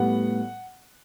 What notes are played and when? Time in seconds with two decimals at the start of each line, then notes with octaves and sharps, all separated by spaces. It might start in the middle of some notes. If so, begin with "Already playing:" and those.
Already playing: A2 G3 B3 F#5